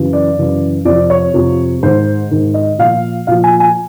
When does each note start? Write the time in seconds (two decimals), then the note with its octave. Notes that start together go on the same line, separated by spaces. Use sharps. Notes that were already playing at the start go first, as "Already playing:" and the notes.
Already playing: F#2 C#3 E3
0.13 D5
0.37 F#2 C#3 E3
0.85 F2 C3 F3 D5
1.10 C#5
1.34 F2 C3 F3
1.83 G#2 D#3 C5
2.31 G#2 D#3
2.54 D#5
2.78 A#2 F3 F5
3.27 A#2 F3 F5
3.44 G#5
3.60 G#5